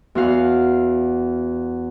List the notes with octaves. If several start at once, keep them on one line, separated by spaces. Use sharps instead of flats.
E2 F#4 F5